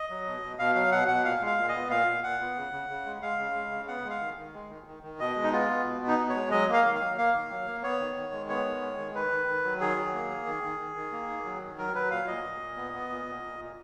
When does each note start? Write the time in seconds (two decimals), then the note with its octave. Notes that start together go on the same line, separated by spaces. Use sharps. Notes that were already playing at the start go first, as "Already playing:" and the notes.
Already playing: D#5
0.09 F#3
0.26 B2
0.42 B2
0.59 B2 F5
0.75 F#3 F5
0.92 B2 F#5
1.08 B2 F#5
1.25 A#2 F5
1.41 G#3
1.47 F5
1.58 A#2
1.69 D#5
1.74 B3
1.90 A#2 F5
2.07 A#2
2.23 A#2 F#5
2.40 B3
2.56 C#3
2.73 C#3
2.89 C#3
3.06 G#3
3.22 G#3 F5
3.39 C#3
3.55 G#3
3.72 C#3
3.88 B3 F#5
4.05 G#3
4.10 F5
4.21 D#3
4.38 D#3
4.54 G#3
4.70 D#3
4.87 D#3
5.03 D#3
5.19 B2 D#5
5.36 G#3
5.43 D#4
5.52 B3 F4
5.69 B3
5.86 B2
6.02 B3
6.08 D#4
6.19 B2
6.29 C#5
6.35 G#3
6.51 F#3 D#5
6.68 A#3
6.73 F5
6.84 D#3
6.95 F5
7.01 F#3
7.17 A#3 F5
7.34 D#3
7.50 F#3
7.67 A#3
7.83 B3 C#5
8.00 D#3
8.16 D#3
8.33 G#3
8.49 B3 C#5
8.65 D#3
8.82 G#3
8.98 D#3
9.15 D#3 B4
9.31 D#3
9.48 D#3
9.64 F#3
9.80 D#3 G#4
9.97 F#3
10.14 A#3
10.30 D#3
10.46 D#3
10.63 D#3
10.79 D#3
10.96 D#3
11.12 A#3
11.29 D#3
11.45 F#3
11.62 D#3
11.78 F#3 A#4
11.95 F#3 B4
12.11 A#2 F5
12.27 A#2 D#5
12.44 A#2
12.61 A#2
12.77 B3
12.93 B3
13.10 A#2
13.26 A#2
13.43 A#2
13.59 A#2